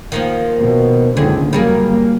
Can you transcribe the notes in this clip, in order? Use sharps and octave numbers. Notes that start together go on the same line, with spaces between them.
D#3 F3 A#3
B2
F#1 C#2 D3 D#3 G#4
C#2 F#3 G3 A#3 G#4 A#4